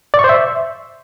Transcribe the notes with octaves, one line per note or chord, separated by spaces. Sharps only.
D5
C#6
C5
E5